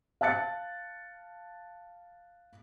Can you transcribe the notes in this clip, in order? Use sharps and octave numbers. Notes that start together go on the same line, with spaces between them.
F5 A5 F#6 A6 C#7